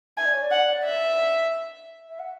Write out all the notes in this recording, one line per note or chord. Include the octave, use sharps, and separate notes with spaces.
E5 G#5
D5
C#5
D5
F#5
E5
E5
F#5